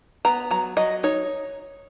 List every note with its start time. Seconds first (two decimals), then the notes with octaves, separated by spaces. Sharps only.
0.25 B3 A#5
0.51 F#3 A#5
0.77 F#3 D#5
1.03 D#4 C#5